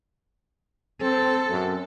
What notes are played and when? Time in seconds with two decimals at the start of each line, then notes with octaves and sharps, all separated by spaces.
1.01 C4 A4
1.50 F#2